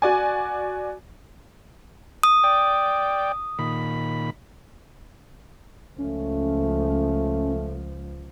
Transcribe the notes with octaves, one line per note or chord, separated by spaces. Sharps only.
F#4 D5 G#5
D#6
D5 G5
A#2 D#3 B5
C#2 F3 A3 C#4